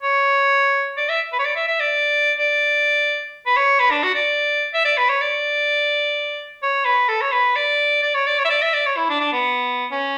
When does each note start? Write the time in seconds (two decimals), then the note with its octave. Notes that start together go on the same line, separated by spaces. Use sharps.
0.02 C#5
0.98 D5
1.09 E5
1.33 B4
1.39 C#5
1.45 D5
1.56 E5
1.67 E5
1.80 D5
2.38 D5
3.46 B4
3.57 C#5
3.80 B4
3.91 D4
4.03 F#4
4.15 D5
4.74 E5
4.85 D5
4.98 B4
5.09 C#5
5.21 D5
6.63 C#5
6.85 B4
7.08 A4
7.22 C#5
7.32 B4
7.56 D5
8.03 D5
8.14 C#5
8.27 D5
8.39 C#5
8.45 E5
8.50 D5
8.62 E5
8.74 D5
8.86 C#5
8.97 E4
9.09 D4
9.20 D4
9.33 B3
9.91 C#4